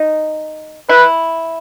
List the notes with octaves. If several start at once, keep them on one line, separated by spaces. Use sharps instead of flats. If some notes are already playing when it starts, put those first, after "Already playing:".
Already playing: D#4
E4 B4